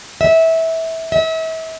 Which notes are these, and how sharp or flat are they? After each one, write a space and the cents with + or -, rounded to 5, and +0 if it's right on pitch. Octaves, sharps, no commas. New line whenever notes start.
E5 -20
E5 -35